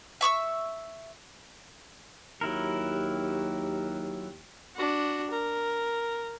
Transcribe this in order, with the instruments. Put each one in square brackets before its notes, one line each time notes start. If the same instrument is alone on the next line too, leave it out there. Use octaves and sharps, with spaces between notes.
[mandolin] E5 C#6 D6 E6
[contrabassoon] D#2 [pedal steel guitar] F#3 E4 A#4 [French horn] G4
[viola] D4 F#4
A#4